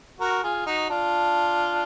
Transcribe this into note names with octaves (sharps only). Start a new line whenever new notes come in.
F#4 A#4
F4 G#4
D#4 F#4
D4 F4